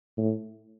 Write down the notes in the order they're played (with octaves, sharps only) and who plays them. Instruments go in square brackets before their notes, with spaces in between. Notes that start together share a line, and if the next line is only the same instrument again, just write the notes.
[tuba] A2